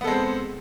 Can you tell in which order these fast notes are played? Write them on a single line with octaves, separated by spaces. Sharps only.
B3 A4 G#3 C4